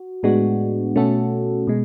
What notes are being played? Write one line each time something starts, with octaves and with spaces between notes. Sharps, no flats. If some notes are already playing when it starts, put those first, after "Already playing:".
Already playing: F#4
A2 G#3 B3 D4 F#4
B2 A3 C#4 F#4 A4
B2 G#3